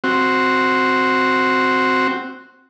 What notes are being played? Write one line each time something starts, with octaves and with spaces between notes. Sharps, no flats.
C4 F#4